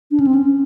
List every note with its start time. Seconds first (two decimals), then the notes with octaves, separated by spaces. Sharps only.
0.11 D4
0.20 C#4
0.27 C4
0.34 C#4